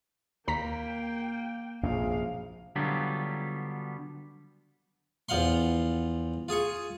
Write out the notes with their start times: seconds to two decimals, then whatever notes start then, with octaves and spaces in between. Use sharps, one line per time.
0.48 D#2 A#3 G5 A#5 B6
1.83 A#1 F#2 C3 G#3 F5
2.76 D3 F#3 G3 B3 F4 G4
5.29 E2 F3 F5 F#5 C6
6.49 F4 G#4 G#5 C#6